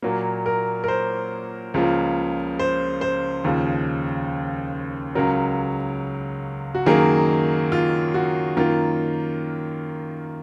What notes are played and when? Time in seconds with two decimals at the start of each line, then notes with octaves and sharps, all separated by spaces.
0.02 A#2 F#3 A#3
0.46 A#4
0.84 A#4
0.88 C5
1.74 C#2 C#3 F3 A#3
2.59 C5
3.01 C5
3.44 D#2 C#3 F3
5.15 C#2 C#3 F#3 A#4
6.75 F#4
6.86 F#2 D#3 F#3 A#3 G#4
7.72 F4
8.14 F#4
8.57 F#2 D#3 A#3 F4